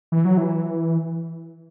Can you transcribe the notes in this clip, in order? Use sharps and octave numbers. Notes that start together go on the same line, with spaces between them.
E3
F#3
E3